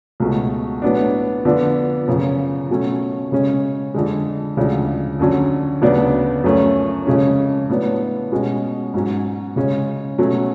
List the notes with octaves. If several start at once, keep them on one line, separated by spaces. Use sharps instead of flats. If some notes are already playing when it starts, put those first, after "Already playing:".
C#2 B2 A3
A2 F#3 B3 D4
F2 D3 F3 B3 D4
F#2 C#3 F3
B2 F#3 A3 C#4
C#3 G#3 C#4
F2 D3 G#3
D2 C#3 F3 G#3 D4
F2 D3 F#3 C#4
D2 C#3 F#3 B3 D4
F#2 F3 A3 C#4
F2 C#3 G#3 C#4
A2 F#3 B3 D4
B2 G#3 C#4
G#2 F#3 C#4
C#3 G#3 C#4
B2 F#3 A3 C#4